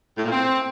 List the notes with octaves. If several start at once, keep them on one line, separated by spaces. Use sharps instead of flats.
A2
A#2
C4